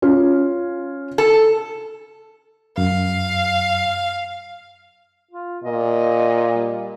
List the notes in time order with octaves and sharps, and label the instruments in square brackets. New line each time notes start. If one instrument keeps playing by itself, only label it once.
[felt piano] C#4 F4
[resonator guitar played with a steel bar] A4
[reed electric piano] F#2 [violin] F5
[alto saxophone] F4
[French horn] A#2 [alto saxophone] D#5
[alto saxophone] G3